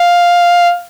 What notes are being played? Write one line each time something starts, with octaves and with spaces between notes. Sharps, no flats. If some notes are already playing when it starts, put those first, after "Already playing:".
Already playing: F5